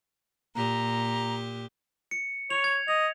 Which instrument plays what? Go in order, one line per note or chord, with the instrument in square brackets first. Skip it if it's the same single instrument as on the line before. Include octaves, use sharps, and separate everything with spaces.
[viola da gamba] A#2 G4 [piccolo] A#5
[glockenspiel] C#7
[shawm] C#5 [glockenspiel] F7
[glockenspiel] G#6
[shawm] D#5 [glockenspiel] F7